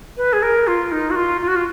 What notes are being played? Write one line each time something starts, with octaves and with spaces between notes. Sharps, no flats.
B4
G#4
A#4
F4
D#4
F#4
F4
F4
F#4
F4